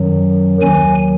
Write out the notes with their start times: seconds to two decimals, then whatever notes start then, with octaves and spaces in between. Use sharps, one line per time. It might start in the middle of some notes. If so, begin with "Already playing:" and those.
Already playing: F#2 D#3 F#3
0.61 D#2 D#3 F#3 G#5